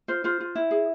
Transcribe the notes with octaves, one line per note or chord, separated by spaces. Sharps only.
F4 C5
F4 C5
F4
E4
G#4